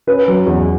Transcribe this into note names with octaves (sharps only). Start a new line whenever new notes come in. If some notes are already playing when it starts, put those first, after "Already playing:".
C#4 B4
F#3
E2